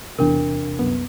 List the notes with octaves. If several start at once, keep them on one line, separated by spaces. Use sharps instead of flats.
E2 C3 D4 A#4
C2 F#2 B3